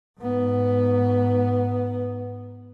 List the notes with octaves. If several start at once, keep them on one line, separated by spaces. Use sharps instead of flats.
G#2 B3